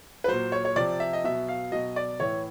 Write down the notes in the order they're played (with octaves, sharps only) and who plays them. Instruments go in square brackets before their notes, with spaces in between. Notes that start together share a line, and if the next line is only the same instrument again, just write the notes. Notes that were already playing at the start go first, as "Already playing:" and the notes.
[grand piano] B4
A#2 F#3 C5
C#5
C#5
C3 F3 D5
E5
D#5
B2 F#3 E5
F5
B2 F#3 D#5
D5
A2 E3 C#5